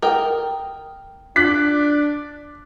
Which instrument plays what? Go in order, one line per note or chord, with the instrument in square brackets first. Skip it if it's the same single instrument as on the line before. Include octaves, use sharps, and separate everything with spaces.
[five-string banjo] A#4 D#5 G5
[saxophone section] D4 [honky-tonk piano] D6 F#6 B6